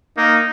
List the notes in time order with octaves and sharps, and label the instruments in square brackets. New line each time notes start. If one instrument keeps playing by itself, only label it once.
[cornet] A#3 [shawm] D#4